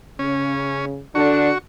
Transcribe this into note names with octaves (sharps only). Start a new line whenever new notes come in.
C#3 C#4
D3 D4 F#4 C#6